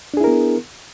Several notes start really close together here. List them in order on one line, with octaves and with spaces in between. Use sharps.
D4 G#4 E4 A#4 B3